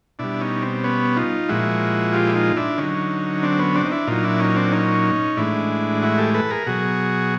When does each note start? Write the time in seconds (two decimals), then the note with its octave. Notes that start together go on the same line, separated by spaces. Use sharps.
0.19 B2 G3 D4 E4
0.41 C#4 D#4
0.62 C4
0.84 B3 C#4
1.16 D#4 F4
1.49 A#2 F3 G#3 E4 F#4
2.13 F4 G4
2.27 E4
2.35 D#4 F4
2.56 D4 E4
2.77 D3 C#4 D#4
2.83 F#3
3.43 C4 D4
3.59 B3 C#4
3.75 C4 D4
3.85 D#4
3.92 D4 E4
4.07 A#2 F#3 D#4 F4
4.23 D4 E4
4.40 C#4 D#4
4.56 C4 D4
4.72 C#4 D#4
5.37 A2 E3 G#3 D4 E4
6.02 E4 F#4
6.18 G4 A4
6.34 A4 B4
6.50 G#4 A#4
6.67 B2 F#3 F#4 G#4